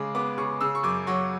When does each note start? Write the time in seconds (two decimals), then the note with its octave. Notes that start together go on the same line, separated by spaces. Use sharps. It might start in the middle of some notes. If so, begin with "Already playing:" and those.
Already playing: C#3 G#3 D6
0.15 B3 D6
0.38 C#3 C#6
0.61 C#3 E6
0.75 C#6
0.83 F#2 D6
1.07 F#3 C#6